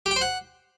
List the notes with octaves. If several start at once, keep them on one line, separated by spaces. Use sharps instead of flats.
G4
G5
C5
F#5